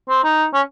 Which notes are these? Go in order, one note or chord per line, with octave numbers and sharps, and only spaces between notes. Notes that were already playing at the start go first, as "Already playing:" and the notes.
C4
D#4
C#4